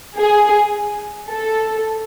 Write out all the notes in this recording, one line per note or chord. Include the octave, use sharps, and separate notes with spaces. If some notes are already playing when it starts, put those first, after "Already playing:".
G#4
A4